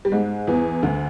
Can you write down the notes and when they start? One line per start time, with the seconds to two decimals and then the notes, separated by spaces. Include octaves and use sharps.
0.05 G3
0.12 G#2 G#3
0.47 E2 E3
0.83 D2 D3